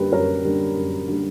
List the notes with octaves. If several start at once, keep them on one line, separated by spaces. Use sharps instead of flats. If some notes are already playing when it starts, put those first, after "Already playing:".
Already playing: F#2 D3 G3 A#3 G4 B4
F#2 A#4 C#5
D3 G3 A#3
F#2
D3 G3 A#3